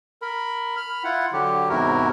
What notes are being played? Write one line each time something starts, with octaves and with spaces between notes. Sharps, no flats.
A#4 B5
B5 F6
E4 F4 F#5
D3 F#3 G4
E2 G#2 C3 E4 F#4 A#4